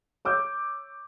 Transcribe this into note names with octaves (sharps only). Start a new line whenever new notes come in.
C#5 D6 E6 G6